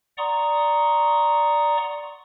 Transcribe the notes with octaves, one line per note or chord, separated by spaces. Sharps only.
D5 F#5 A#5 C6 C#6 D#6